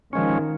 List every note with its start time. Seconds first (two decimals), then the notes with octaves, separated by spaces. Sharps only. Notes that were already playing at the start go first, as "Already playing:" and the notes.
0.13 D#3 F3 G#3 C#4